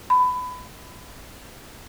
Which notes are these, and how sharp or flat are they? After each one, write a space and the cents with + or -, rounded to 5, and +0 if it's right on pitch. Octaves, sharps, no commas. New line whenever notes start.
B5 +20